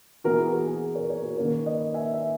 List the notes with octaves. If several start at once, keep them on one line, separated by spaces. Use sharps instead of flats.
E3 B3 F#4 A#4
E4 G#4
F#4 A#4
G#4 B4
A#4 C#5
A#4 C#5
F#4 A#4
D#3 A#3 C#4 A#4 C#5
B4 D#5
E5 G#5
E5